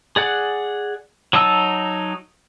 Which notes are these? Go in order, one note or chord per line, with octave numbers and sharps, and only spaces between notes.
G#4 D5 F#5
F#3 D#4 A5 E6